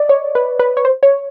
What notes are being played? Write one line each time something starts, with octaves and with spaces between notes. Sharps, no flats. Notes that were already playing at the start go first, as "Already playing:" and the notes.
Already playing: D5 D#5
C#5
B4
B4
C#5
C5
C#5